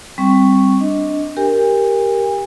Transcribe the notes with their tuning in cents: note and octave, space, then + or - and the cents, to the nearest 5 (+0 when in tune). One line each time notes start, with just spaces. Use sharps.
G3 +0 C4 +0 C#6 +0
D4 +0 D#5 +10
G4 +0 A#4 +0 G#5 -40